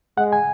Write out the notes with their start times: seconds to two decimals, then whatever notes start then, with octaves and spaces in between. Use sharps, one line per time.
0.17 G#3 F#5
0.33 G#5